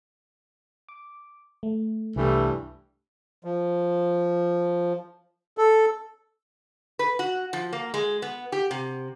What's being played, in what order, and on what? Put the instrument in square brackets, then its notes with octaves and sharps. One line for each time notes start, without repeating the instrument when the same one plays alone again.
[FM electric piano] D6
A3
[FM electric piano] C2 [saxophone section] G2 E3 A3
[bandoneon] F3
A4
[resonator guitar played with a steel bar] B4
F#4
F3
A#3
G#3
B3
G4
C3